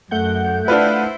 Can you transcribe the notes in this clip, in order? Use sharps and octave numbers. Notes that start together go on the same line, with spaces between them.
F#2 A3 F#5 G6
D4 E4 F4 B4 C5